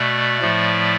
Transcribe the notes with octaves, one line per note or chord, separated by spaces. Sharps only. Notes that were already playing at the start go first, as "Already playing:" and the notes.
Already playing: B2 A3 D5
A2 F3 A3